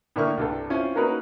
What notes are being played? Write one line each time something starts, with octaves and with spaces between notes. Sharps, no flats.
A2 D3 A#3 E5 C#6 F6
C2 G2 A4
C4 C#4 E4 F4 C5
A#3 C#4 D#4 F#4 A#4 B4